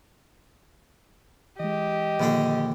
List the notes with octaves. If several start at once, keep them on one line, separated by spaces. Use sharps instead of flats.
E3 G#3 G4 D#5
A#1 D3 D#3 F3 D4